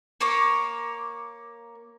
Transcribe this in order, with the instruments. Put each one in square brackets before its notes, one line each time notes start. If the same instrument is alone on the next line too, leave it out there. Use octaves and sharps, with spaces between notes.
[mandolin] A#3 C#5 D6